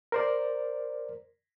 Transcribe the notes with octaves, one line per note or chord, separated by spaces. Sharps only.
A#4 C5 D5